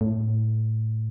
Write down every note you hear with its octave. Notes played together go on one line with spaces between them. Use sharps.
A2